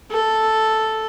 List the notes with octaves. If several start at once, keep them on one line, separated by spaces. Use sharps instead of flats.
A4